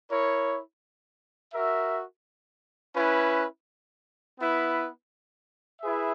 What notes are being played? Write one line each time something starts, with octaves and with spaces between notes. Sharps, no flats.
E4 A#4 C#5
F#4 A#4 E5
C#4 E4 B4
B3 E4 B4
E4 G#4 B4 E5